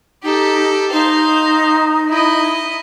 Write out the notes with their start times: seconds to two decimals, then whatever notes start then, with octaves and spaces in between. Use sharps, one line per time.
0.23 D#4 G4 A4
0.92 D#4 C5 F5
2.09 E4 D#5